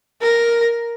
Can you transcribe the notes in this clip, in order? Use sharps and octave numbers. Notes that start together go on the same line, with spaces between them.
A#4